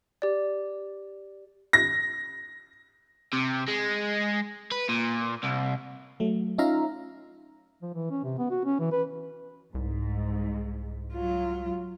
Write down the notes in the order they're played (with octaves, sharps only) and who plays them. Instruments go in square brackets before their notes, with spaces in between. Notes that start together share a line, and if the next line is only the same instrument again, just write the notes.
[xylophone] G4 D5
[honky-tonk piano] A#6
[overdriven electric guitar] C3
G#3
B4
A#2
C2
[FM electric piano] F#3 A3
C#4 D#4 F4 E5 F5 A#5
[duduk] F3
E3
C#4
C3
B3
F#4
C#4
E3
B4
[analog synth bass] C2 [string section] G#2
[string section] F#3 [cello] F4